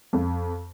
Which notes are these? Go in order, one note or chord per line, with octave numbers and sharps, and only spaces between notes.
F2